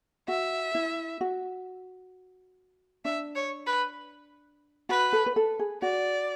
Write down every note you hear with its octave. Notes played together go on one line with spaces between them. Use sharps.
F#4 E5
E4
F#4
D4 E5
C#5
B4
F#4 B4
A4
B4
A4
G#4
F#4 D5